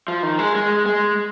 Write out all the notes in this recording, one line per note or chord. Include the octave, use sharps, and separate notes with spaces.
F3
D#3
G#3
G#3
G#3